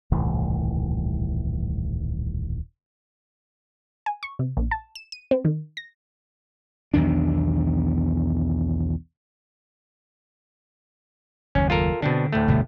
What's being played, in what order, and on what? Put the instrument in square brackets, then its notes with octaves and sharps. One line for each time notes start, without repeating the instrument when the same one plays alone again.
[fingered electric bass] D#1 C2 A2 E3
[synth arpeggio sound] G#5
C#6
C3
A#1
A5
E7
D#7
C4
D#3
A#6
[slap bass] B1 E2 D#3 D4
[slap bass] F#1 D#2 [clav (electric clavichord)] C#4
[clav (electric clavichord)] F4 A4 A#4
[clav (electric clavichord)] B2 C4 D4 [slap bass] D3
[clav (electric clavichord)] D2 A2 A3
[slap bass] G1 B2 B3